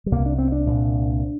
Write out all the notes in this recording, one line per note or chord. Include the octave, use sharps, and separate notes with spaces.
G3
C2 C3 A#3
D4
C4
D4
C2 A#2